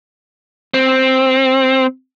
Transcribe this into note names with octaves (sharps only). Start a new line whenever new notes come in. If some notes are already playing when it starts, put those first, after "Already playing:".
C4